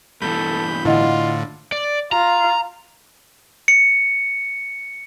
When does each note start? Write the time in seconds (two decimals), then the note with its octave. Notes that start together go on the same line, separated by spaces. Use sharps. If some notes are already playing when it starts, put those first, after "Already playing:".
0.22 G2 B2 E3 A4 B5 G6
0.85 A2 D3 E4 F4 D#5 F#5
1.72 D5
2.12 F4 A#5
3.68 C#7